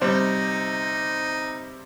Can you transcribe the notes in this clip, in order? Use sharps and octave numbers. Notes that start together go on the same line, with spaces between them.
C3 G3 C4 D#4